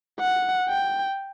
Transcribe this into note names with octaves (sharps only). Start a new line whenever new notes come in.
F#5
G5